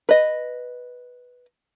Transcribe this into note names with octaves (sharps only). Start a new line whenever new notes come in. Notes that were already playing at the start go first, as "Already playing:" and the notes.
B4 D#5